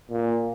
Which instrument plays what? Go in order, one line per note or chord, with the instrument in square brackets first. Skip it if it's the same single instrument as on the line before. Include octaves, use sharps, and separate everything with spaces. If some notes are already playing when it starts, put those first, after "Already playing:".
[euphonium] A#2